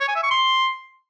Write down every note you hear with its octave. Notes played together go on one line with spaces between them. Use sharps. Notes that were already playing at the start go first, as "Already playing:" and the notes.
C#5
G#5
E5
C#6
C6